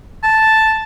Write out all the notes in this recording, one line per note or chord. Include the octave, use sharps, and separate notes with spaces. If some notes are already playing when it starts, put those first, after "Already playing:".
A5